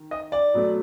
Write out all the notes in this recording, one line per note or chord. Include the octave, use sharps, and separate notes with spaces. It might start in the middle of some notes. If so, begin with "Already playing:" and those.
Already playing: D#3
D#5
D5
B2 F#3 A3